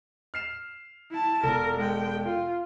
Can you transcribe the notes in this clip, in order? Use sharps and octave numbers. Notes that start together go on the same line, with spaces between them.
F6 C7 E7
E4 A5
E1 A4 A#4
G#3 G5
F4